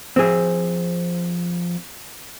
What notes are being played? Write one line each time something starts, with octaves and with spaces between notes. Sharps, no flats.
F3 C4 G#4